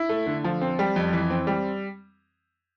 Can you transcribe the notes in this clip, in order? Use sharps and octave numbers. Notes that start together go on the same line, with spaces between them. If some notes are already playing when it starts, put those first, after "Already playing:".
Already playing: E4
A3
D3
F3
C4
G3
F2
E3
C4
G3